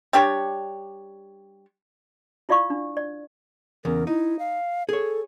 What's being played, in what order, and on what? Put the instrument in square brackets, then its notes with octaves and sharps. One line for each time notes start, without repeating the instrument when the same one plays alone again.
[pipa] G3 D4 G4 C#5
[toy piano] E4 F4 D5 F5 C#6
D4
D5
[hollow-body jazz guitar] E2 C#3 [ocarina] A#4
[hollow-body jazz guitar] D#4 [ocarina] E4
[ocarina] F5
[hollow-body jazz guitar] G#4 C#5 [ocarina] A4